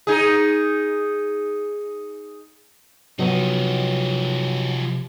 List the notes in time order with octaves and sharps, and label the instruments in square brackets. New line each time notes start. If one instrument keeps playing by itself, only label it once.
[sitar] D#4 G#4
[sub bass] C3 [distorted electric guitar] F3 D#4 [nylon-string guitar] F#3 B3